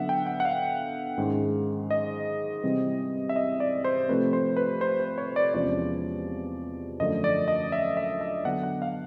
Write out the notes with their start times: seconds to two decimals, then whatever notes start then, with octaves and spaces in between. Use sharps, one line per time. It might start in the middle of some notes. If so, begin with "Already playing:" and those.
Already playing: D3 F#3 B3 D4 E5 F#5
0.09 G5
0.27 F#5
0.40 F#5
0.45 F5
1.18 G#2 D#3 G#3 C#4
1.91 D#5
2.63 C3 E3 G3 C4
3.29 E5
3.36 D#5
3.60 D5
3.84 C5
4.08 C3 F3 A3 C4 B4
4.33 C5
4.57 B4
4.81 C5
5.00 C5
5.18 C#5
5.36 D5
5.54 E2 C3 F3 G#3 C#4 D5
7.00 F#2 D3 F3 A3 D4 D#5
7.24 D5
7.48 D#5
7.72 E5
7.97 E5
8.21 E5
8.45 D3 F#3 B3 D4 F#5
8.63 F#5
8.82 F5